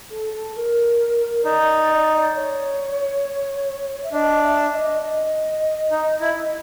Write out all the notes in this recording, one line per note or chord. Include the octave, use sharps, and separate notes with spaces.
A4
A4
A#4
D#4 D5
C#5
E5
D4 D#5
E5
D#5
D#5
D#4
E4